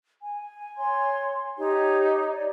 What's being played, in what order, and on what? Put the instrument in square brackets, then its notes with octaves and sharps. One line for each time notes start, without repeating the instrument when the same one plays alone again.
[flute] G#5
[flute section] C#5 C6
[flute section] D#4 C#5 [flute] G4
[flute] D5